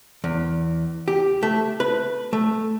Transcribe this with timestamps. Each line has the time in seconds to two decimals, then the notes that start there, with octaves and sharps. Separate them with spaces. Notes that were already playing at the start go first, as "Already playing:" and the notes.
0.24 E2
1.08 G4
1.43 A3
1.80 B4
2.33 A3